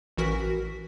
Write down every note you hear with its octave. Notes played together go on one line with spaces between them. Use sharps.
A1 E3 F#4 A#4 B6